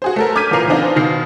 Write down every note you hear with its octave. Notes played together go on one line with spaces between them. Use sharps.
F#4 G#4 C5
A3 A4 A#4
D6 F6 G6 G#6 B6 D#7
A1 A#2 E3 A#4 C7 F7
E3 B3 C4 D4 D#4 F4
B2 D#3 A#6 C7